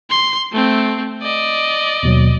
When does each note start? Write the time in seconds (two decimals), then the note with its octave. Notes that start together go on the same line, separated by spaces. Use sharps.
0.10 C6
0.52 A3 C4
1.22 D5 D#5
2.03 D#2 B2 F#3